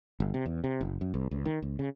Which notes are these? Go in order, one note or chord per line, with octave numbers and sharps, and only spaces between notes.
G1
C3
E2
C3
F#1
F#2
C2
C#2
D#3
C#2
C#3